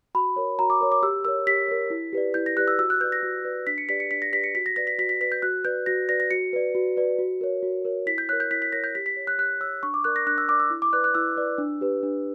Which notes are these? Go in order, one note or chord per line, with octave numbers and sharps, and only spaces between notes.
F#4 B5
A#4 C#5
F#4 A#5
D6
A#4 C#5
D6
G4 E6
A#4 C#5 E6
G4 B6
A#4 C#5
E4
G4 B4 D5
E4 G6
A#6
G4 B4 D5 F#6
E6
F#4 E6
F#6
B4 D5 G6
A#6
F#4
B4 D5
D4 B6
C#7
G4 B4 D5 B6
C#7
D4 B6
A#6
G4 B4 D5 B6
C#7
F#4 B6
A#6
B4 D5 A#6
B6
F#4 B6
B6
B4 D5 B6
G6
F#4 F#6
B4 D5 G6
F#4 A#6
B4 D5 A#6
A#6
F#4 C#7
B4 D5
F#4
B4 D5
F#4
A#4 C#5
F#4
A#4 C#5
E4 B6
G6
A#4 C#5 F#6
G6
E4 B6
B6
A#4 C#5 A#6
G6
G4 B6
B6
C#5
F#6
G4 F#6
C#5 E6
D4 C#6
D6
A#4 D5 F#6
A#6
D4 F#6
E6
A#4 D5 D6
E6
E4
D6
B4 D5 F#6
F#6
E4 E6
B4 D5
D4
G4 B4
D4